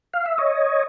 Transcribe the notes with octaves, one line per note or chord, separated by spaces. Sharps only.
F5
E5
C#5 D#5